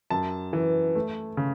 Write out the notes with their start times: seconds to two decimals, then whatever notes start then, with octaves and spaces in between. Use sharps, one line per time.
0.10 F#2 A5
0.53 E3
0.95 A3
1.37 C#3